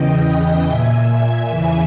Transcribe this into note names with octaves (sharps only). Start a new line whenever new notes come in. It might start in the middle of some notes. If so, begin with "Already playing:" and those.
Already playing: E2 C#3 E3 D#5 G5
A#2 E5 G#5
E2 C#3 E3